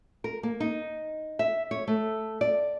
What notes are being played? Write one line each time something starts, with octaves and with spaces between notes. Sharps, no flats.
A#4
A#3
D#4
E5
C#5
A3
D5